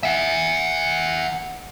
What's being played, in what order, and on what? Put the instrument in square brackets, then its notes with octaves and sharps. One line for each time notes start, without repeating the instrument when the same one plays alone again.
[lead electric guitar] E5 F#5